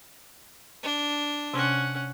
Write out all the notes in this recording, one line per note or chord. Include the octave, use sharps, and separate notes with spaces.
D4
C3 C#4 F#5 C6